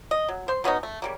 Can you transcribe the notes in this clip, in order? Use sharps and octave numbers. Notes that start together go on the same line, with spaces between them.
D#5
F#3
C5 C6
F#3 B3 C#4 D#4
A3
C#3 G3 A#3